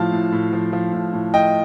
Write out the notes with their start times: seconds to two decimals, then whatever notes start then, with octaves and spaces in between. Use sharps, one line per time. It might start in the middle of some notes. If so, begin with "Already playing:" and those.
Already playing: A2 F3 F5 A5
0.12 A2
0.32 A2
0.53 F3
0.73 F3
0.93 A2
1.13 A2
1.34 A2 D#5 G5